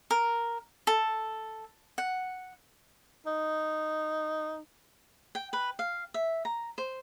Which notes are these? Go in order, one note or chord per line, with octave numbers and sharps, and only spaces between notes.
A#4
A4
F#5
D#4
G5
B4
F5
E5
A#5
C5